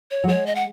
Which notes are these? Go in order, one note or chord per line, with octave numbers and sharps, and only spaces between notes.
C#5
F#3
G#3 C#5
D#5
F#5